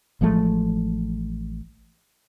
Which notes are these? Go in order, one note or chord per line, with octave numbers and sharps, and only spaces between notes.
A1 F3 G#3 A3